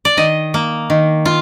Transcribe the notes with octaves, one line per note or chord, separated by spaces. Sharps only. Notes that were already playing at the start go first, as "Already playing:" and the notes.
D5
D#3 D#5
A#3
D#3
F4